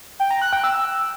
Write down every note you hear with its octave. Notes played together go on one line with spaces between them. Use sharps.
G5
A#5
F#6
G5
E6